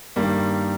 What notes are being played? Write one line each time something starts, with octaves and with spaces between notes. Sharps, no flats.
G2 D#3 G3 A#3